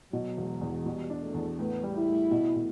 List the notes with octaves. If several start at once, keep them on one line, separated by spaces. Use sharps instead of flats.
B2 F#3
E1
E2
B2 G3
D4
A3
E2
A2 B3
G3
E4
A2
B2
B2